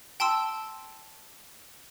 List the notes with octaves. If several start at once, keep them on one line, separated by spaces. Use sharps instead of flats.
G5 A5 C6 E6